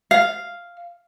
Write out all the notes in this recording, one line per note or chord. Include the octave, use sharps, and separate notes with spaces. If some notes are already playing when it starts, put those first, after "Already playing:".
F5